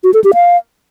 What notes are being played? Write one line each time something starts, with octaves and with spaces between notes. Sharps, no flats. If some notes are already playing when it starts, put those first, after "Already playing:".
F#4
A4
G4
F5